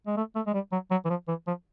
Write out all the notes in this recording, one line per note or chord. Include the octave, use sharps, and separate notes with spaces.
G#3
A3
A3
G#3
G3
F#3
F#3
E3
F3
E3
F3